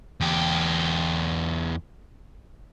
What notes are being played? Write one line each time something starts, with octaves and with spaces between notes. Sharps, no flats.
E2 G4